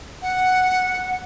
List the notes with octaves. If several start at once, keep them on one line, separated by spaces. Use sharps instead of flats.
F#5